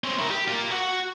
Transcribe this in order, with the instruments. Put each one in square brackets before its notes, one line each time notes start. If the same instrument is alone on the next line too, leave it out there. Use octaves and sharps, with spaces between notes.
[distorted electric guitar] C4 C#5
E4 A#4
G4
A#3 F4
F#4 F#5